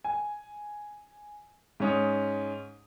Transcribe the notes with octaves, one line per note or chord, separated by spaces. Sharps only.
G#5
G#2 C#4 D#6